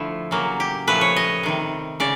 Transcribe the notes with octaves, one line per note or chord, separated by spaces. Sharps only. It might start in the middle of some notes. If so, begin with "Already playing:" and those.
Already playing: D3 F3 A3 E4
C#3 F#3 A#3
G4
A#2 F3 A3 B4
C#5
D#5
C3 D#3 G3
C#3 D5